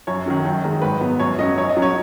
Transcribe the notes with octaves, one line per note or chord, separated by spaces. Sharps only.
F#2 C#5
D#3 F#3 C#4
F#2
D#3 G#3
G#2 B4
F#3 B3
F#2 C#5
F#3 C#4 D#5
F#2 C#5
D#5
F#3 C#4
C#5